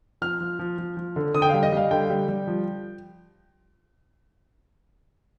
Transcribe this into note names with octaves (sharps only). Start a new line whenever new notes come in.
F3 F6
F3
F3
F3
F3
D3
D3 D#6
G5
G3 F5
D#5
G3 F5
D3 G5
G3
G3
F3